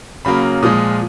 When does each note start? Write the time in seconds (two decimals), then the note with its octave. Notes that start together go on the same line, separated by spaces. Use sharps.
0.25 C#3 F#3 A#3 B5
0.63 A#2 F3 G#3 D#6